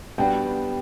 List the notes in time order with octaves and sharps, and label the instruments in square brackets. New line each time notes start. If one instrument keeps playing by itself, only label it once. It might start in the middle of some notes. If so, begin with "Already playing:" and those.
[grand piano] G3 B3 D4 F#4 [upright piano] G5